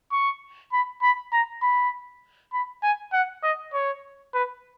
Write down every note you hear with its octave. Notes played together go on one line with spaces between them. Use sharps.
C#6
B5
B5
A#5
B5
B5
G#5
F#5
D#5
C#5
B4